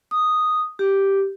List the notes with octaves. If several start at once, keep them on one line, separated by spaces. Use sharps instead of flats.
D#6
G4